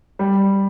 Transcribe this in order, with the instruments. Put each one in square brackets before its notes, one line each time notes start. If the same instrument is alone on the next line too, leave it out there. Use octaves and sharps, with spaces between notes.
[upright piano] G3